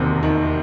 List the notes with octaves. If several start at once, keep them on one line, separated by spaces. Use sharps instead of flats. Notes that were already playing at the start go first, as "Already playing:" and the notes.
Already playing: E1 D#2 C3 C4
D#3